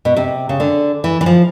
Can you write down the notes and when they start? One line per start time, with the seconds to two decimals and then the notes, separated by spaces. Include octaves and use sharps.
0.05 B2
0.16 C3
0.49 C#3
0.60 D3
1.04 E3
1.21 E3
1.26 F3